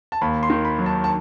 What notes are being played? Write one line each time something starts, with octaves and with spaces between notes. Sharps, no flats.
A5
D#2 B5
C6
D#3
B5
F#3
A5
A5